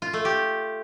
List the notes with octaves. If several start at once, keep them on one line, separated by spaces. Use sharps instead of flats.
F4
A3
G4